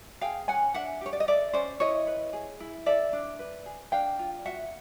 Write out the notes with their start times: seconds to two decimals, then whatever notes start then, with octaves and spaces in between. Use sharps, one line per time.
0.21 G#4 F5 G5
0.48 C#4 F#5 G#5
0.74 D4 E5 F#5
1.01 G4 C#5
1.13 D5
1.20 D#5
1.28 A4 D5 E5
1.53 C#4 C5 D5
1.80 E4 C#5 D#5
2.07 B4
2.33 G#4
2.60 E4
2.86 A4 D5 E5
3.13 D4
3.39 B4
3.66 G#4
3.92 D4 F5 G5
4.19 F4
4.45 F#4 E5 F#5